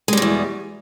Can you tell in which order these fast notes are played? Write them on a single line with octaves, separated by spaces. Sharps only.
G#3 G3 B2 E2